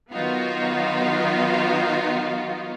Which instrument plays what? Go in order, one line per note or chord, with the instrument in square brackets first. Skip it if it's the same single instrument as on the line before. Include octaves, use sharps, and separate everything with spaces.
[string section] D#3 F#3 B3 D#4 F4 F#4